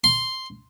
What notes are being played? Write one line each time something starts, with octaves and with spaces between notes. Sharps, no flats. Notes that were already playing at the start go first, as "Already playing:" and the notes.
C6